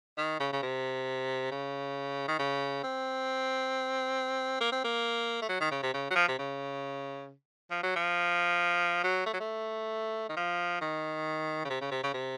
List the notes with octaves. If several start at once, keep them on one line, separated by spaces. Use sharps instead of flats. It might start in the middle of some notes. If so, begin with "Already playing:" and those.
D#3
C#3
C#3
C3
C#3
D#3
C#3
C4
A#3
C4
A#3
A3
F#3
D#3
C#3
C3
C#3
F#3
F3
C3
C#3
F3
F#3
F3
F#3
A3
F#3
A3
D#3
F3
D#3
C#3
C3
C#3
C3
C#3
C3